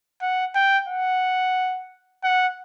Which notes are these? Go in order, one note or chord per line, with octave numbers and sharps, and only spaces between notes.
F#5
G5
F#5
F#5